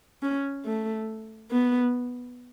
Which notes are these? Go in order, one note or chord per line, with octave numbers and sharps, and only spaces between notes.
C#4
A3
B3